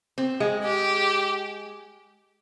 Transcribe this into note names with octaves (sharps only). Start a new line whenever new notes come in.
C4
G#3
G4